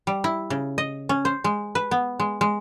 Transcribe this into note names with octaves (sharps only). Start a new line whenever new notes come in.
G3
E4
C#3
D#5
C#4
C5
G#3
B4
B3
G#3
G#3